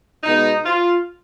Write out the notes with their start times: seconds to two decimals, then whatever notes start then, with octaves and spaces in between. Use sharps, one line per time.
0.23 B2 G#3 B3 D#4
0.65 F4